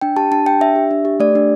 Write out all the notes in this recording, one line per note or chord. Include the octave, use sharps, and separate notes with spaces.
D4 G5
G4 A5
D4 A5
G4 G5
D4 E5
G4
D4
G4
A3 D5
D4 G4